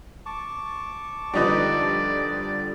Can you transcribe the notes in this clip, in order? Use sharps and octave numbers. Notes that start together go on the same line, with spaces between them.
A5 C#6 D6
D3 F3 G3 D4 D#4 B4 D5